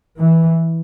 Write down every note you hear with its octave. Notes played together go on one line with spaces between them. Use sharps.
E3